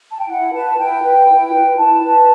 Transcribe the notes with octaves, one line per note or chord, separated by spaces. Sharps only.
A5
G5
E4 F#5
B4 A5
E4 G5
B4
E4
B4
E4 A5
B4